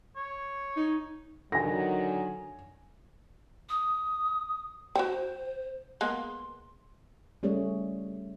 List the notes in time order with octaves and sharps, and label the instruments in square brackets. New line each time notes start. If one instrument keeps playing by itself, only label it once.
[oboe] C#5
[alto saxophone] D#4
[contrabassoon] D3 [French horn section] D#3 F#3 [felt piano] G#5 A#6
[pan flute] D#6
[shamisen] F#4 G5 [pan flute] C5
[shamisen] G#3 A#3 B3 [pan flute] C6
[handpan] G3 A3 C#4 G#4 C#5